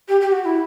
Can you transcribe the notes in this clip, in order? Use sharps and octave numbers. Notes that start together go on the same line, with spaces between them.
G4
G4
F#4
E4